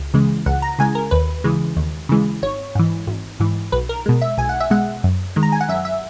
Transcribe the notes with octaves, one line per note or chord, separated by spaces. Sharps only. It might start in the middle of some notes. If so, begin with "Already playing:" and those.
Already playing: C#2
C#3 E3 G#3
C#2 F#5
A#5
C#3 E3 G#3 G#5
A#4
D#2 B4
C#3 E3 G#3
D#2
C#3 E3 G#3
G#1 C#5
G#2 E3
G#1
G#2 E3
B1 B4
A#4
B2 G#3
E5
B1 G#5
F#5
E5
B2 G#3 F#5
F#2
D#3 G#3
A#5
G#5
F#5
F#2 E5
E5